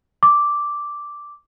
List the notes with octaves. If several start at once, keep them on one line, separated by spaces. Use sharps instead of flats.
D6